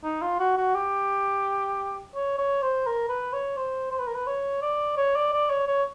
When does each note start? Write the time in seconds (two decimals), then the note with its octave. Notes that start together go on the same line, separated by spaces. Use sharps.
0.04 D#4
0.22 F4
0.40 F#4
0.57 F#4
0.75 G4
2.15 C#5
2.38 C#5
2.62 C5
2.87 A#4
3.09 B4
3.33 C#5
3.57 C5
3.91 C5
3.99 B4
4.07 A#4
4.15 B4
4.27 C#5
4.62 D5
4.97 C#5
5.16 D5
5.33 D5
5.50 C#5
5.68 C#5